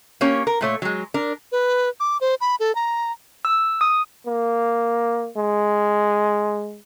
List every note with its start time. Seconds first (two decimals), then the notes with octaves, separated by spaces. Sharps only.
0.21 A#3 C#4 G4 C#5
0.47 A#4
0.61 A#2 A3 C#5
0.82 F#3 G#3
1.14 D4 A#4
1.52 B4
2.00 D6
2.21 C5
2.41 B5
2.60 A4
2.75 A#5
3.45 E6
3.81 D#6
4.27 A#3
5.37 G#3